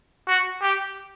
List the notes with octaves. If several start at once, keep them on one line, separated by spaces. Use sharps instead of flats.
F#4
G4